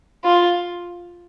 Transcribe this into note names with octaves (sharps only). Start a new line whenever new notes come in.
F4